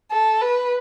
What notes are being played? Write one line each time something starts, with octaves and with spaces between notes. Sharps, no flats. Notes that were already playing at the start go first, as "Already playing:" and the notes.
A4
B4